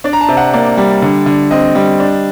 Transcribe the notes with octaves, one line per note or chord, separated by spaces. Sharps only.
D4 D5
A#5
A5
C3
F#5
A#3 D5
G3
D3
D3
C4 D#5
G3
D4